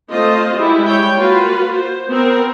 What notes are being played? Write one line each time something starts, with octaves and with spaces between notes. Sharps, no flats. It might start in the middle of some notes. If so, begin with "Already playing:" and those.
A3 C4 F4 C5 D#5
G3 G#3 E4
C#5 G5
A#3 F4 F#4 B4
C5
B3 C4 A#4